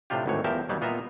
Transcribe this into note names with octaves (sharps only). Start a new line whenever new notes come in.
A2 C3 D4 F4 G4
G#1 D2 A2 E3 C#5
E2 F3 G4 A#4 E5 A5
D#2 B2 F#3 G3
A#2 B3 F4 D#5 E5 A#5